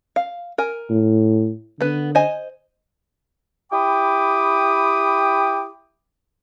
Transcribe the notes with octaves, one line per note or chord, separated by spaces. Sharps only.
F5
A#4 G#5
A2
D3 B3 B4
C5 D#5 G#5
E4 G4 G5 B5 D6 D#6